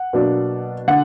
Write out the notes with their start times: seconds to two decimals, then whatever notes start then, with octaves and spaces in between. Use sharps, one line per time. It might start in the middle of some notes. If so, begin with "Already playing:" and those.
Already playing: F#5
0.13 B2 F#3 A#3 D4
0.88 D3 F#5